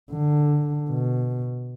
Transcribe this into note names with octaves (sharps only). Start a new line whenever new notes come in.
D3
B2